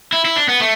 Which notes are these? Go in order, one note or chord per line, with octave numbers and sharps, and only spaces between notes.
E4
E4
D4
B3
A3